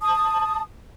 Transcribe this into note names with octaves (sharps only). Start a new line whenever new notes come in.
A5 D#6